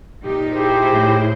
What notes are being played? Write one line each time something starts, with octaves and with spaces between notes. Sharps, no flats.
A#2 D#4 G4
E4 G4 G#4 C5
A2